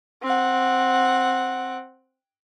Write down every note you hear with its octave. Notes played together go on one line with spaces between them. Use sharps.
C4 F#5